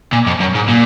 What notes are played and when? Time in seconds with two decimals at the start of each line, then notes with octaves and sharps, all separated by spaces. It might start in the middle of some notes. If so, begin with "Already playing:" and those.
0.12 A#2
0.27 F2
0.40 F#2
0.55 G#2
0.69 A#2